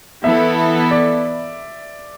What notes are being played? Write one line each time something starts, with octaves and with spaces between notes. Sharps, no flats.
E3 B3 E4 A4 E5
D5